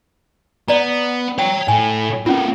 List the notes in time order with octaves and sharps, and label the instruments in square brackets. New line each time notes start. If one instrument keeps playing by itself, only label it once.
[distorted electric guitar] B3 [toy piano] D5 A#5
[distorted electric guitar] C#5 A#5 [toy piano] G5
[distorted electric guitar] A2 [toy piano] G#5
[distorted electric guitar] A#3 C4 [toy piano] C#4 F4